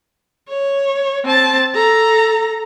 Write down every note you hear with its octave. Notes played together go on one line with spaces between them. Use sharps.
C#5
C4 A5
A4 A#5